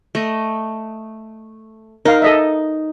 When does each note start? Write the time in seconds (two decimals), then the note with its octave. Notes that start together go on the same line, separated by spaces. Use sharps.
0.15 A3 D#5
2.05 D#4 A#4 F5
2.22 A4 D#5 E5